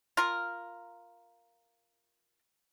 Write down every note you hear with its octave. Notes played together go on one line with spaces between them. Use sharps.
F4 A#4